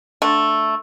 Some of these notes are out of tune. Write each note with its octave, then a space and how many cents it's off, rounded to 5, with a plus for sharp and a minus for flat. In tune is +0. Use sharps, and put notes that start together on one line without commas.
D3 +0 A3 +0